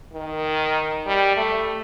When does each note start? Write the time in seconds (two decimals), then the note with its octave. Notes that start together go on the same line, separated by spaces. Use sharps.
0.13 D#3
1.06 G3
1.37 A3